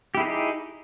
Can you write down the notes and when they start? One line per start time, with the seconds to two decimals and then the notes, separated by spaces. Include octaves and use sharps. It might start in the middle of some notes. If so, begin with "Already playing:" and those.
0.15 G4
0.17 E4
0.20 G#4
0.23 D#4